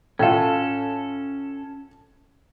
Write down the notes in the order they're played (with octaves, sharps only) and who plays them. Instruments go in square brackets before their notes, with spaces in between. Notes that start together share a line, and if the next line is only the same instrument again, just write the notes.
[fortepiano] A2 F4 [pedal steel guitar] C#4 A4